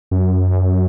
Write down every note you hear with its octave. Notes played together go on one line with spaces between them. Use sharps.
F#2